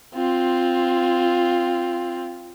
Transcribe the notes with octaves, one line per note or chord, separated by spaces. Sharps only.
C4 F4